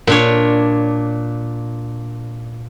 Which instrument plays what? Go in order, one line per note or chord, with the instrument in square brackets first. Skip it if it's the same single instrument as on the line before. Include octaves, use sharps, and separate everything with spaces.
[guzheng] A#2 D4 C#5